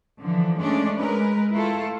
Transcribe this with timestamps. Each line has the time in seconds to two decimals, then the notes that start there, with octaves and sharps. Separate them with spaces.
0.19 D3 E3 F3
0.61 G#3 A3 C#4 D4 D5
0.99 G#3 A#4 B4
1.53 A3 E4 F4 A4